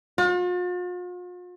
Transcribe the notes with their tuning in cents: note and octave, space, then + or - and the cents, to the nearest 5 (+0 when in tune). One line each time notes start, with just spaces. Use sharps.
F4 +45